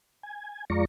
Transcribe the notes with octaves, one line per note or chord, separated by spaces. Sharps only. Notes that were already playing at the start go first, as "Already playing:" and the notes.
G#5
F2 G#3 F4 D5 A#5 C#6